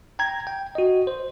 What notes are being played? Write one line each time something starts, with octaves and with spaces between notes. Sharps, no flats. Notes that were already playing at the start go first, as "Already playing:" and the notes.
G5 A#5 G#6
G5
F#4 D#5
C5